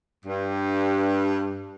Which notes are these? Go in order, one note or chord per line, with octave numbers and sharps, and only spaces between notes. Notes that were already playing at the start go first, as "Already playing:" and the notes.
G2